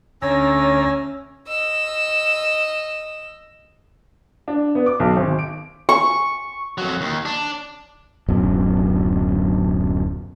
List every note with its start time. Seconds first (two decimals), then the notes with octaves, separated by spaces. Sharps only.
0.22 D2 A3 C#4 C#5 G#5 A#5 E6
1.48 D#5 E6
4.48 D4
4.75 B3
4.86 D6
5.00 B1
5.16 G#1
5.39 D7
5.89 C#6
6.78 F2 F#3
7.01 D#2
7.25 D4
8.28 D1 F#2 B2